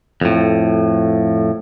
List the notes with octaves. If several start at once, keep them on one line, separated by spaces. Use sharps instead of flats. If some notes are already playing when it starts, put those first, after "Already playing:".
F2 A2